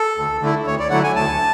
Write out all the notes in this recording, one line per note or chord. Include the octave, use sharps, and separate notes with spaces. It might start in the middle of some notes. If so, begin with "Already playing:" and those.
Already playing: A4
D2
D3 A3 E4
D2 C#5
D5
D3 F#3 A3 E4 F#5
G#5
D2 A5